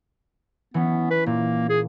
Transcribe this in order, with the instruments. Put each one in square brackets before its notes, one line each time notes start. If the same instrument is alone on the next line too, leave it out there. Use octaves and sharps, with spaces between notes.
[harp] E3 C#4 [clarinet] B3
[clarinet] B4
[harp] A#2 [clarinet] A#3
[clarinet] G#4